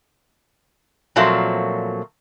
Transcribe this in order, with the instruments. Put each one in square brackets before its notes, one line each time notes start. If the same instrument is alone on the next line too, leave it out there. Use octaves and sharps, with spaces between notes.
[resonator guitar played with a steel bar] A#2 F3 F#3 A3 A#3 C4